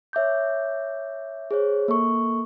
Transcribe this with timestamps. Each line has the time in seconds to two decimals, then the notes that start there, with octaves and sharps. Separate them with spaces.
0.13 C#5 E5 D6 G6
1.51 G#4 C5 C#5
1.88 A#3 A4 C#6